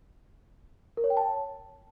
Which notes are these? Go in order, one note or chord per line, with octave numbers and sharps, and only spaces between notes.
A#4
C#5
G5
A5